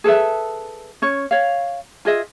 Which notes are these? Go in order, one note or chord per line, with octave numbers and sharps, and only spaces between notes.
G#4 A4 B4 E5
C#4 C#5
C#5 F5
F4 G#4 D#5 E5